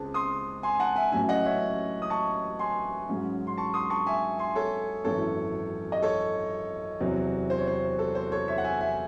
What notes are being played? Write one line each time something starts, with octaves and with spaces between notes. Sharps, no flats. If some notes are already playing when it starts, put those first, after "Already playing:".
Already playing: C#2 C#3 G#3 C4 A5
C6 D#6
G#5 C6
F#5 A5
E5 G#5
A1 A2 F#3 C#4 E5 G#5
D#5 F#5
C#5 E5
D#6
A5 C#6
G#5 C6
G#2 F#3 C#4
C6
A5 C#6
C6 D#6
A5 C#6
E5 G#5
G#5 C6
A4 C#5
G#1 F#2 E3 A4 C#5
D#5
A4 C#5
E2 C3 F#3 C4
C5
C#5
C5
A4
C5
A4 C#5
C#5 E5
F#5
E5 G#5
E5 G#5